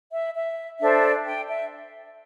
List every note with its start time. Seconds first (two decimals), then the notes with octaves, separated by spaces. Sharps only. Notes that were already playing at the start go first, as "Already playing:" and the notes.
0.12 E5
0.35 E5
0.80 D4 A4 C5 E5
1.26 G5
1.48 E5